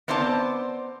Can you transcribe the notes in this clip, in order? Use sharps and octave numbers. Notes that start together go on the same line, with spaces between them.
B3 C4 C5 D5 E5 A5